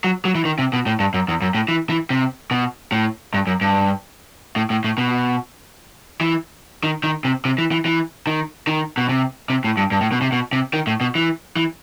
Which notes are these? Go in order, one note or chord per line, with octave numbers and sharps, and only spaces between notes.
F#3
F#3
E3
D#3
C3
B2
A2
G2
F#2
E2
F#2
A2
E3
E3
C3
B2
A2
G2
F#2
G2
A2
A2
A2
B2
E3
D#3
D#3
C3
C3
E3
E3
E3
D#3
D#3
B2
C3
C3
A2
G2
G2
A2
B2
C3
B2
C3
D#3
A2
B2
E3
E3